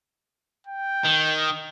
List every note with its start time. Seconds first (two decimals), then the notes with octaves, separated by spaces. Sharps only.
0.67 G5
1.04 D#3